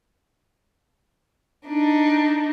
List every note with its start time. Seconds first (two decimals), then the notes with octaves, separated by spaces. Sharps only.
1.67 D4 D#4